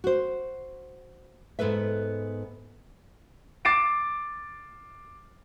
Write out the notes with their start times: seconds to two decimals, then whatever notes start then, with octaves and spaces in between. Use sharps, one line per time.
0.04 F#4 C5
1.59 G#2 B3 A4 B4 E5
3.65 D6 A6 C7 D7 E7